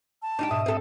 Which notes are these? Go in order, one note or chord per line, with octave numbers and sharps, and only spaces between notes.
A5
D4 D#4 F4 G4
G#2 B2 E5 D#6
C4 A4